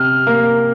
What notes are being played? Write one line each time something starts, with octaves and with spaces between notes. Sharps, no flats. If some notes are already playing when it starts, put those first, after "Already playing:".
Already playing: C3 F6
A#3